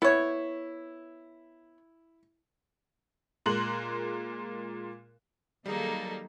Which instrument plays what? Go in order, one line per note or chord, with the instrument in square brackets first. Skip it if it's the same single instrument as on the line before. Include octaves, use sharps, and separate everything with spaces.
[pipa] B3 C#5 [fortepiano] E4
[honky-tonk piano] A#2 G#3 A#4 C6 F#6 F#7
[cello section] D#3 F#3 A4 [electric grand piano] G3 [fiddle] A#3 D#4 [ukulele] G#4 F5